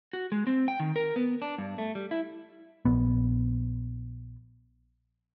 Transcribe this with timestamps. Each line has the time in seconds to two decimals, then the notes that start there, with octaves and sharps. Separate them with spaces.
0.13 F#4
0.32 G#3
0.47 C4
0.68 G5
0.80 D#3
0.96 A#4
1.16 B3
1.42 D4
1.58 G2
1.78 A3
1.95 G3
2.11 E4
2.85 A#1 B3